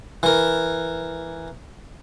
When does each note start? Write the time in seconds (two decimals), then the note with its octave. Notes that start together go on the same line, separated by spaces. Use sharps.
0.23 E3 A#4